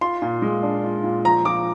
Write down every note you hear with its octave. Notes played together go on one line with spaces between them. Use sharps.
F4 C6
A#2
G#3
D4
F4
A#2
F3 A#5
F3 D6